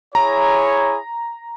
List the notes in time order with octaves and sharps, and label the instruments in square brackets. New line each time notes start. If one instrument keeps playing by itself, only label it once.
[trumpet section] E4 G#4 C#5 [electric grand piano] A#5